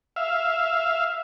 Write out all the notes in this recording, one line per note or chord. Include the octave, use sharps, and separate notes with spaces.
E5 F5